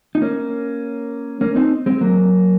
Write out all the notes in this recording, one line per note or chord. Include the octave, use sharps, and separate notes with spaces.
D#4
A#3 C#4
A#3 C#4
C4 D#4
G#3 C4
F#3 A#3